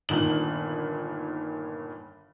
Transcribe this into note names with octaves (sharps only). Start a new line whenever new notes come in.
G1 A#2 D#3 F#7